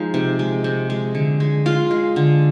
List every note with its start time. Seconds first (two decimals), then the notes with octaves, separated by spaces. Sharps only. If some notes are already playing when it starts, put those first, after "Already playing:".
Already playing: F3 G#3 D#4
0.14 C3
0.39 G#3
0.64 C3
0.90 G#3
1.15 D3
1.40 G#3
1.66 G#3 F4
1.91 G#3
2.16 D3